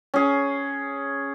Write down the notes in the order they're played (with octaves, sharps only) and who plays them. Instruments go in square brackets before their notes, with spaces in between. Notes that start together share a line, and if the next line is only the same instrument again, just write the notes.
[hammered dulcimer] C#4 G#4